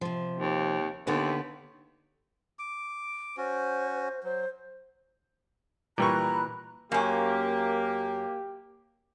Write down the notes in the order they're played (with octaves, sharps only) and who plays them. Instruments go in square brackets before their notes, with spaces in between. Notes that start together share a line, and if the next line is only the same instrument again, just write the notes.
[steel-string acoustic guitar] C3 F3
[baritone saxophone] D#2
[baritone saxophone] D#2 [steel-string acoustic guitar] D3 B3 B4
[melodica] D6
[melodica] C#4 F#4 [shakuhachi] C5
[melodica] F#3 [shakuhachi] C5
[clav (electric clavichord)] A#2 E3 [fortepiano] G3 C#6 [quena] A#5 [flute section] B5 F#6
[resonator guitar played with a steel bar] F#2 C#4 [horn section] A#3 [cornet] G4